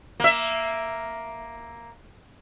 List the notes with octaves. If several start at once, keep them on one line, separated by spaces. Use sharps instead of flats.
A#3 E5